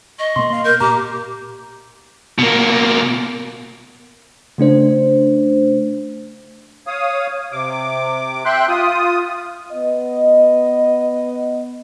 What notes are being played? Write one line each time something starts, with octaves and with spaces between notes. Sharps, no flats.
D#5 C#6
B2 A#3 C6
F5
A#4 G6
A#2 G4 A#5 D6
B2 A#3
C#3 A3 D4 C5
C#5 F5 D#6
C3 D6
E5 G5 C6 F#6
F4 D#6
B3 D#5